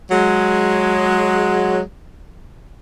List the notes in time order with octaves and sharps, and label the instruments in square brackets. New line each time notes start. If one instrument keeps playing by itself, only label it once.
[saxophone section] F#3 G#3